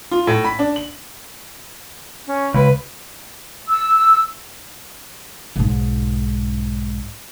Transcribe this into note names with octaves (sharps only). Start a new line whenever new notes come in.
F4
A2
B5
D4
F#7
C#4
C#2 B4
E6
B1 G#2